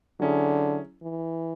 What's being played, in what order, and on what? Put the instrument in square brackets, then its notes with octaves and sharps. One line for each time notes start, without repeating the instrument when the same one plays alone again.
[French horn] D3 [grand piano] F#3 C#4 E4 G#4
[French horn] E3